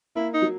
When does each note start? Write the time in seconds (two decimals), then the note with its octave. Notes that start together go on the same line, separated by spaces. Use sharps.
0.16 A#3 E4
0.34 D#4
0.42 F#3